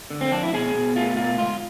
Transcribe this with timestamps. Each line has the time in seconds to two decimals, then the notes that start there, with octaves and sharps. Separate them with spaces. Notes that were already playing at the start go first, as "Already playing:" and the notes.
0.10 D3
0.21 C4
0.32 F2 D4
0.43 E4
0.53 B2 G#4
0.74 B2
0.96 A3 F4
1.17 B2 F4
1.38 G#2 F4